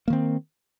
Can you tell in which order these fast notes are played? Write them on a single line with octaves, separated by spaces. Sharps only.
A#3 D#3 C4